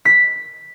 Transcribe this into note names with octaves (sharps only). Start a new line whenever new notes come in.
B6